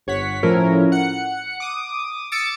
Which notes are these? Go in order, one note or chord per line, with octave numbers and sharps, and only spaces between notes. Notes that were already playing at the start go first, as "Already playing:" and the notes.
G1 C#5 F#5 B6
A2 F3 C#4 E4 A#4
F#5 C#7
D6 D#6
D6 E6 A6 C#7 D7